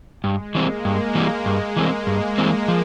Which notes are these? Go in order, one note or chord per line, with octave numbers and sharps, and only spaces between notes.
G2 G#3
E3 G3 A#3 C4
G2 G#3
E3 G3 G#3 C4
G2 G#3
E3 G3 A#3 C4
G2 A#3
E3 G3 C4
F3